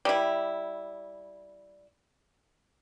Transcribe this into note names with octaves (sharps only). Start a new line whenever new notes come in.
G3 E4